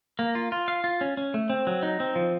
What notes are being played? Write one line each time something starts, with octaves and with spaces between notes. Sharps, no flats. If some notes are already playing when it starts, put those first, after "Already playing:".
A#3
F4
F4
F5
F4
C#4
C#4
A3
C4
F#3
D#4
C4
F3